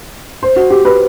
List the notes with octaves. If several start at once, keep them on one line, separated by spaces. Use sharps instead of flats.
C5
F#4
G4
B4